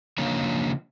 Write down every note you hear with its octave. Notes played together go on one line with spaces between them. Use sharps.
C#3 F3 A#3 D4 C#5 A#5